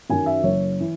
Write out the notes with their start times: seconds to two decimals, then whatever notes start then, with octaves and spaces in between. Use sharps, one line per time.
0.10 F#2 D#3 F#3 G#5
0.26 E5
0.43 F#1 C#5
0.80 E3